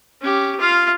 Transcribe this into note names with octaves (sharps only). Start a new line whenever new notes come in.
C#4 G4
F4 F5